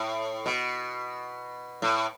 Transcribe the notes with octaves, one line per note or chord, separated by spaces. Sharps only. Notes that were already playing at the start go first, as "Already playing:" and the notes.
Already playing: A2
B2
A2